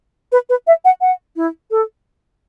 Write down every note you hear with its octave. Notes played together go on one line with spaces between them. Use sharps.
B4
B4
E5
F#5
F#5
E4
A4